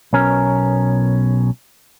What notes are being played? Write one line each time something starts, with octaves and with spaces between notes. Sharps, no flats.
B1 B2 C#4 A#4